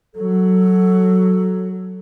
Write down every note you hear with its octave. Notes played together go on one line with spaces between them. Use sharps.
F#3 A4